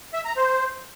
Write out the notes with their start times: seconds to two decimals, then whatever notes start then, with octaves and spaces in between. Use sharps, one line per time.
0.13 E5
0.25 A#5
0.37 C5